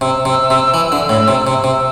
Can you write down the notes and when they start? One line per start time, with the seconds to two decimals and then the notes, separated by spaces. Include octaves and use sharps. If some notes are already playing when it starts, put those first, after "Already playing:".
0.01 C3 E6
0.25 C3
0.50 C3
0.74 E3
0.92 D3
1.09 A2
1.28 C3
1.46 C3 E6
1.64 C3